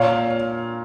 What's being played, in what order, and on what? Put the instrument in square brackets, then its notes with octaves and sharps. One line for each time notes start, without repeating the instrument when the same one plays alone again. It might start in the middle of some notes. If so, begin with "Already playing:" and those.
Already playing: [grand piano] A#2 C#5 F5